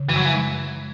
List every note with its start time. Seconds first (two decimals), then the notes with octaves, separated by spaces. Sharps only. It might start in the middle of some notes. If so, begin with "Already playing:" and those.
Already playing: C#3
0.09 F#2 E3
0.17 F#3
0.25 E3
0.34 G#3